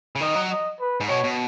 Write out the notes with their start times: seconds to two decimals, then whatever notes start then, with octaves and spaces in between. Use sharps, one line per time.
0.16 C#3
0.21 D#3 D#5
0.35 F#3
0.50 D#5
0.80 B4
1.00 G#2
1.09 B2 C#5
1.24 B2